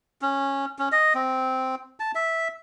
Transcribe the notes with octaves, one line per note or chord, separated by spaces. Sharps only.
C#4
C#4
D#5
C4
A5
E5